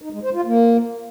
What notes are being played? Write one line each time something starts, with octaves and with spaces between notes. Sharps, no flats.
D#4
G#3
C5
F4
A#3